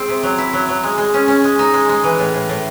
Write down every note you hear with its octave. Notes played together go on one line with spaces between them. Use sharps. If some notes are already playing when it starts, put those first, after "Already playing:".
Already playing: G#3 C4
C3
F#3
E4
F#3
F#3
G#3
G#3
C#4
C#4
G#3
D#4
G#3
G#3
E3
A2
A2
A2